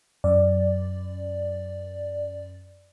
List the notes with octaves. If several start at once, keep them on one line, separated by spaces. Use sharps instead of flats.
F#2 D5